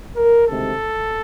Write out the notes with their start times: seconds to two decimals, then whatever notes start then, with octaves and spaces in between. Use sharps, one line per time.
0.16 A#4
0.47 D2 C3 D#3 G#3 A4